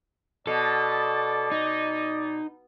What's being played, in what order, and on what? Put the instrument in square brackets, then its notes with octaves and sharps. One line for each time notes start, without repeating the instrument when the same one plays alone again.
[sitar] B2 [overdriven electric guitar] A4 [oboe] D5
[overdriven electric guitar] D#4